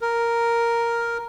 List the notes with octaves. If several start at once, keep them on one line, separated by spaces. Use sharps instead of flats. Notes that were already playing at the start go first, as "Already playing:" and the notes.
A#4